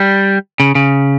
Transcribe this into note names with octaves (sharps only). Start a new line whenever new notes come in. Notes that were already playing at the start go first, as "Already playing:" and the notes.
Already playing: G3
C#3
C#3